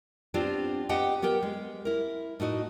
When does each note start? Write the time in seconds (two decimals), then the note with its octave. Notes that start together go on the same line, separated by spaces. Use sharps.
0.34 B3 C4 D4 F4 G4
0.89 G4 B4 D#5 F#5 G5
1.22 B3 G4 A#4 G5
1.43 G#3
1.85 E4 A#4
2.40 A2 D#4 F#4 D#5